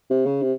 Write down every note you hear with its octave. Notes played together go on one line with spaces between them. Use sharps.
C3
C#3
C3